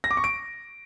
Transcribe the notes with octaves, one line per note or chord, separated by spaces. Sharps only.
A#6
D6
C#6
D7